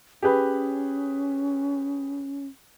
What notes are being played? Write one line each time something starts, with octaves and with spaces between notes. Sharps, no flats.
C#4 G4 G#4 B4